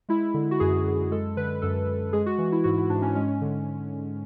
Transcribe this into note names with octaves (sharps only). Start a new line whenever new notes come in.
G#3 E4
D3
F#4
F#2 G#4
F#2
G#3 A4
D3 B4
F#2 A4
F#2
G#3 G#4
F#4
E3
F#4
E4
G#2 F#4
E4
G#2 D4
C#4
G#3 C#4
D3